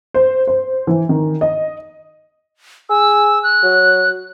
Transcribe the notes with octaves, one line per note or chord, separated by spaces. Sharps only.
C5
C5
E3
D#3
D#5
G#4 E6
F#6
F#3